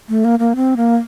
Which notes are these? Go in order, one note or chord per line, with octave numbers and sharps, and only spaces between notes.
A3
A#3
A#3
C4
A#3